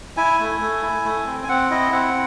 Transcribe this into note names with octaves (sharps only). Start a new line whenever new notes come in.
E4 G#5
A3
A3
E4
A3
C4
G#5
C4 F#5
E4 D#5
C4 F#5